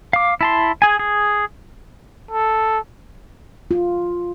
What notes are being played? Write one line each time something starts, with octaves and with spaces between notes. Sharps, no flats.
F5 D6
E4 A5 C6
G#4 G#5
G#4
A4
F4